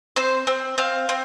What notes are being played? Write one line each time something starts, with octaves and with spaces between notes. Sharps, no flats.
C4 C5
C4
C4 F5
C4